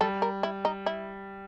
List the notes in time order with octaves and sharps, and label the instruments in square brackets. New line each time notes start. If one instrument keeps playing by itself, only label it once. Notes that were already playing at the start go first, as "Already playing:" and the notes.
[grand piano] G3 [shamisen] A4
[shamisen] A#4
E4
D#4
E4